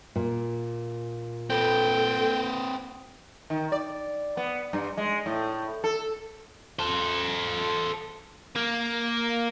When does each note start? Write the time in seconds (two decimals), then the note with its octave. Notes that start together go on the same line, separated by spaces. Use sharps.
0.16 A#2
1.50 C4 A4 B4 G5
3.50 D#3
3.72 D5
4.37 B3
4.73 G2
4.97 G#3
5.26 A2
5.84 A4
6.79 A4 C5
8.56 A#3